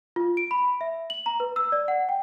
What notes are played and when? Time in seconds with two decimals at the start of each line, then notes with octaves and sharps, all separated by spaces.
0.16 F4
0.37 D7
0.51 B5
0.81 E5
1.10 F#7
1.26 A#5
1.40 B4
1.56 E6
1.72 D5
1.88 F#5
2.09 G5